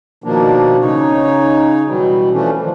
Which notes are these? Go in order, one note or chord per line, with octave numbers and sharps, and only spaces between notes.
B2 D#3 F3 A#3 D4
C#3 D#4 C#5
B2 E3 F#3 G3
E3 F3 A3 C#4 D4
D#3 F3